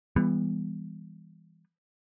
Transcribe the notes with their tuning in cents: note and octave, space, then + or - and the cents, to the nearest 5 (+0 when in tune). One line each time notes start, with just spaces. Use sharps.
E3 +0 G3 +35 B3 +0